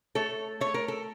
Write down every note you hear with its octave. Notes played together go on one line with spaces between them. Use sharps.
A3 A4 C#5
A3 C#5
A#4
A4